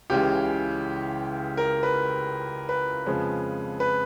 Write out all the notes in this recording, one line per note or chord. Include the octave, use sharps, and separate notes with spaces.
C#2 C#3 E3 G#3 G4
A#4
B4
B4
F2 C#3 F3 G#3
B4